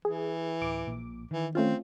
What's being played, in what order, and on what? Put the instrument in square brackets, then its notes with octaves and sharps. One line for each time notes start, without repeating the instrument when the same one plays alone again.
[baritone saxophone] E3 [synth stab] G#4
[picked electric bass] D1 [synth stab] D6
[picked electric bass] A#1 A#2
[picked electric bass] D#3 [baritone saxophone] E3
[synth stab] A3 C#4 F4 [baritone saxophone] C4